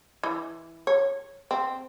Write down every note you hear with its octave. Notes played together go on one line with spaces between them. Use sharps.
E3
C#5
C4